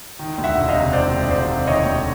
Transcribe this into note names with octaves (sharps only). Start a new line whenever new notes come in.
D#3
D2
E5 F#5
E1
D#5 F5
C3
D#3 C5 D5
D2
E1 C5 D5
C3
D#3 C#5 D#5
D2